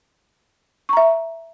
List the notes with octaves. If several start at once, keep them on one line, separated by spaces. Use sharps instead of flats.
E5 A#5 C#6